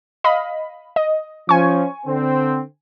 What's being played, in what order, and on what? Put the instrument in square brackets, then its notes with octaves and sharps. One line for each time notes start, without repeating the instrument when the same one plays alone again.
[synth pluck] D#5 F5 B5
D#5
[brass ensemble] F3 C#4 [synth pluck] G#5 C#6
[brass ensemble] D3 C4